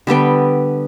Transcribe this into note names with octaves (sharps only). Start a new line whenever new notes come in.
D3 G3 B3 G5